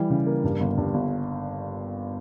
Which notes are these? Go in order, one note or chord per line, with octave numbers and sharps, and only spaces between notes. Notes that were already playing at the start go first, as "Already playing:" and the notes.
Already playing: E3 G3
C#3
A#3
G2
G1
G2
G1